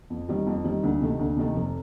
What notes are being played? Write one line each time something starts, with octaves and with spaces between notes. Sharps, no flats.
F2
D#3 G3 C4
F2
D#3 G3 C4
D2
C3 D#3 A3
D2
C3 D#3 A3
F1